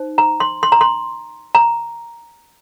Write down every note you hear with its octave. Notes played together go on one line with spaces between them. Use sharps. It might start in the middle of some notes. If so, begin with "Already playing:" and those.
Already playing: D#4 C5
A#5
C6
C6
A#5
C6
A#5